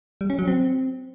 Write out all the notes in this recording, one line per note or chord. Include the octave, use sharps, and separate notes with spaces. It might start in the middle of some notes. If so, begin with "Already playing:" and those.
G3
C#4
F#3
C4